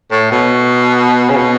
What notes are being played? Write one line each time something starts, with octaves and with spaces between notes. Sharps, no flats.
A2
B2
C#3
B2